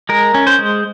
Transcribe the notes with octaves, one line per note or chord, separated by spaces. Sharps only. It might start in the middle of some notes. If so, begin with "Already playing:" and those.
G#3 A#4
C#4
C5
G#3